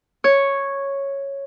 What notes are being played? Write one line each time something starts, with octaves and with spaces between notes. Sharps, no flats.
C#5